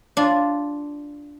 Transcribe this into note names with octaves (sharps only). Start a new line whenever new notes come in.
D4 F4